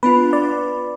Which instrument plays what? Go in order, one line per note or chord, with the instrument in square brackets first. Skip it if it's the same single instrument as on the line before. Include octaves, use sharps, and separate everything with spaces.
[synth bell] B3 D4 F4 [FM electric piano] B4
[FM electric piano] D5